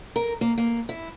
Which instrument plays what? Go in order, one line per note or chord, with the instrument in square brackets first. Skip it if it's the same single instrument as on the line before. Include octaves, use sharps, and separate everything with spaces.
[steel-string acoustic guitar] A#4
A#3
A#3
E4